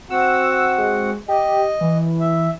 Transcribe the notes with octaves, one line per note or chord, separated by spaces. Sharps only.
C4 F#4 F#5 E6
G#3
G4 D#5
E3
E5